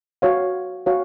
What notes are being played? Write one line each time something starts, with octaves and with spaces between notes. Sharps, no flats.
F#4 C#5 F5
F#4 C#5 F5